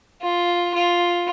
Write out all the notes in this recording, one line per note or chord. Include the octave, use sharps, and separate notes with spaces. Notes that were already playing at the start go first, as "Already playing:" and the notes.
F4
F4